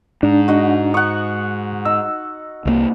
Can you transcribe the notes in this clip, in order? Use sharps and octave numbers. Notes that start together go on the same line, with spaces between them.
G#2 D4
F#4 D#5 F#5
F#5 C#6 D#6
D#4 E6
C2 F#3 A#3